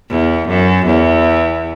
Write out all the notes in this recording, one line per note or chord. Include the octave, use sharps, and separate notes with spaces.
E2
F#2
E2